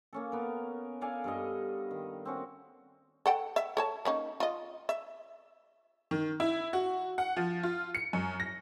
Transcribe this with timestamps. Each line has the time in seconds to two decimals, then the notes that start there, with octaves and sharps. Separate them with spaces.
0.13 A#3 C#4 A4
0.32 B3 A#4
1.01 A4 D5 F5 G#5
1.24 G2 A4 D#5
1.91 D#3
2.25 C4 C#4 F#4
3.26 A4 F#5 G5
3.56 E5
3.77 A4 C#5 A5
4.05 A#3 C#4 D#4
4.40 F4 D#5
4.89 E5
6.11 D#3
6.40 E4
6.73 F#4
7.18 F#5
7.37 F3
7.63 F4
7.95 C#7
8.13 F#2
8.40 A#6